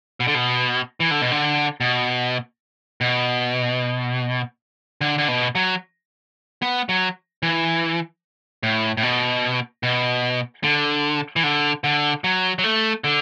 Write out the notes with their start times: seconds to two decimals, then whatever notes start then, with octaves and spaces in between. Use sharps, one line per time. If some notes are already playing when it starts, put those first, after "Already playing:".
0.20 B2
0.28 D3
0.35 B2
1.00 E3
1.11 D3
1.21 B2
1.31 D3
1.81 B2
3.01 B2
5.01 D3
5.18 D3
5.28 B2
5.55 F#3
6.62 B3
6.89 F#3
7.43 E3
8.63 A2
8.97 A2
9.03 B2
9.83 B2
10.63 D3
11.36 E3
11.43 D3
11.84 D3
12.24 F#3
12.59 F#3
12.64 A3
13.04 D3